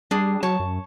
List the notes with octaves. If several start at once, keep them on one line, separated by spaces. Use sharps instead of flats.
G3 D4 G#4
F#3 C#5 A5
F#2